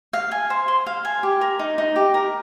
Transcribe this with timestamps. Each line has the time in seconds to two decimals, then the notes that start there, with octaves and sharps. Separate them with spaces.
0.13 F5
0.31 G#5
0.50 C5
0.68 C6
0.86 F5
1.05 G#5
1.23 G4
1.41 A#4
1.59 D#4
1.78 D#4
1.96 G4
2.14 A#4